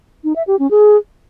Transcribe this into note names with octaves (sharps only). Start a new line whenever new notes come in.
D#4
E5
G4
C#4
G#4